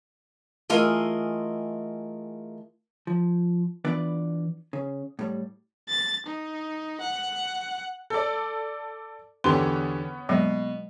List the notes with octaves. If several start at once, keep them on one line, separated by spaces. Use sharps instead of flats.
E3 A3 F4 G#4 A#4 D#5
F3
E3 B3 D4 F4 B4 D5
C#3
A2 G3
A6
D#4
F#5
A4 D5
E2 D3 B3 C#4 G4 C6
B2 F#3 G#3 A#3